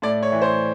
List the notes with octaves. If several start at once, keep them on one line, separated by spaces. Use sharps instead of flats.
A2 D5
C#5
E3
C5